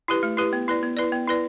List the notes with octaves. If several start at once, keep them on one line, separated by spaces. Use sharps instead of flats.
E4 G4 B4
A3
E4 G4 B4
B3
E4 B4 D5
B3
E4 B4 D5
B3
E4 B4 D5